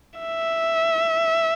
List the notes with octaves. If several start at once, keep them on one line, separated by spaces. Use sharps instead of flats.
E5